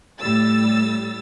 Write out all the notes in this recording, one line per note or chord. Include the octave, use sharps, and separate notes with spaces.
A2 G3 E6 A6